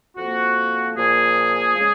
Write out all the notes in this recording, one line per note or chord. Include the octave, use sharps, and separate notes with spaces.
F2 F3 A#3 F#4
A#2 F3 A#3 G#4
C#3 G#3